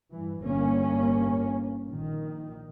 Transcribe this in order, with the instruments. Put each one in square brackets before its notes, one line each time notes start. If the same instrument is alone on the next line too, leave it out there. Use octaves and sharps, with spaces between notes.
[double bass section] G2 E3
G1 A#3 C#4
A#1 D#3